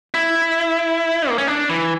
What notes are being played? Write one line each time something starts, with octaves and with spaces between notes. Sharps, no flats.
E4
A#3
C#4
D4
E3